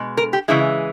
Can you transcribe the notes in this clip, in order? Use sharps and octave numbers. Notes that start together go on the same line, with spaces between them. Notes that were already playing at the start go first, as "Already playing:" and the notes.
Already playing: B2 G#3
A#4
G4
C#3 E3 G#3 E4